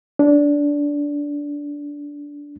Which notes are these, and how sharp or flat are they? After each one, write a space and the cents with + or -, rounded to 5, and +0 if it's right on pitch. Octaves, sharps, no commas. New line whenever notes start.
D4 -15